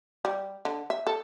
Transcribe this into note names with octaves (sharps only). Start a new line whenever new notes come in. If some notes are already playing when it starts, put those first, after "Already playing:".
G3
D3
E5
A4